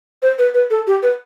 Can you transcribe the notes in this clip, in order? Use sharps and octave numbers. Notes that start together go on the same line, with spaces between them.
C5
B4
B4
A4
G4
B4